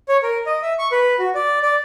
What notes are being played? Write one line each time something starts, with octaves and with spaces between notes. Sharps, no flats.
C#5
A#4
D#5
E5
C#6
B4
F#4
D5
D5